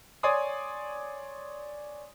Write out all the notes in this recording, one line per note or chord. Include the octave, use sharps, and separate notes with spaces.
C#5 D5 G#5 C6 D#6